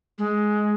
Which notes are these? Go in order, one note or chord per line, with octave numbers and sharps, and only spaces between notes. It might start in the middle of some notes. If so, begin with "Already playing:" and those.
G#3